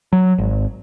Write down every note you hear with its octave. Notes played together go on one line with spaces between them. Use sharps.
F#3
G#1